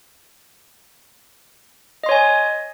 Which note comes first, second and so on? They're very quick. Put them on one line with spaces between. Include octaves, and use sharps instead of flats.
D#5 C6 C#5 G#5